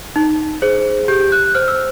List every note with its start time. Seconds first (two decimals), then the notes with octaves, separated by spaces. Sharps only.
0.16 D#4
0.62 G#4 C5
1.08 G4 G6
1.32 F#6
1.55 C5 F6
1.68 E6